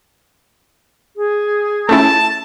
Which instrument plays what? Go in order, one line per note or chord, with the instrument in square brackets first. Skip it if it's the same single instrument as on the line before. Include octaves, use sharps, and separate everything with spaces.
[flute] G#4
[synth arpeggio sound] A3 C#4 E4 [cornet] A5